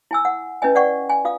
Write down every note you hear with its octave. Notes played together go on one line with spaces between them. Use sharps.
E4 G#5 E6
F#5
C#4 E4 B4 D#5 G#5
D5 F#5 G5 C#6
G#5
F4 F5 D#6